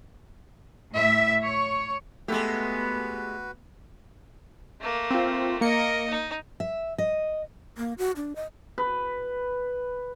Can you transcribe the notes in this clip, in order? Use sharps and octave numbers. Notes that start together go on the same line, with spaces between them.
A2 E5
C#5
G#3 A3 B3 F#4 G4 A4 B4 B5
A3 A#3
C4 F4
A#3 A#4 D#5 C#7
D#4
E5
D#5
A#3
F#4
D4
D#5
B4